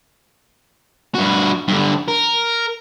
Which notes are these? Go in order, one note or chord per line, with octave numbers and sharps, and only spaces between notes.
G2 F#4
G2 D3
A#4